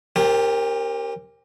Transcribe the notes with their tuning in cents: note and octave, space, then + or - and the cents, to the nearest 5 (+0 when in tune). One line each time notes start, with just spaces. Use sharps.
C4 +45 G4 +0 A#4 -5